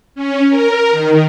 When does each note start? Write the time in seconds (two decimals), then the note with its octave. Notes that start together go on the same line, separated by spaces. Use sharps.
0.15 C#4
0.50 A#4
0.91 D#3